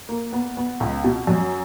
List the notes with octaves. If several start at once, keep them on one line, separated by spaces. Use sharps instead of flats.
A#3
B3
B3
C#2
B2
F#2